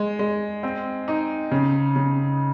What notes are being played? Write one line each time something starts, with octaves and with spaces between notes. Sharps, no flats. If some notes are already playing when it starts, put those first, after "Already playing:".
Already playing: G#3
G#3
C4
D#4
C#3
C#3